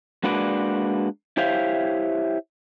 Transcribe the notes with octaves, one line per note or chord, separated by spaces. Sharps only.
G#3 A#3 D4 F#4 B4 D5
E4 G4 C5 C#5 E5 F5